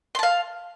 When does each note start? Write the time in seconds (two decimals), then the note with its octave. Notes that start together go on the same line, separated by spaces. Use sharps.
0.15 C6
0.19 A5
0.23 F5